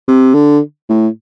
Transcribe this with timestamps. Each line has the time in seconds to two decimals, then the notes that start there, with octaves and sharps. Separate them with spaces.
0.08 C3
0.34 D3
0.90 A2